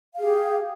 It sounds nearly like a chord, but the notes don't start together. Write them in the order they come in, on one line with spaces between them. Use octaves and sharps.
F5 G#4 G4